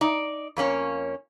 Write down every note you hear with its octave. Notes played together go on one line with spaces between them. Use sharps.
D#4 D5
F2 A#3 C#4 C#5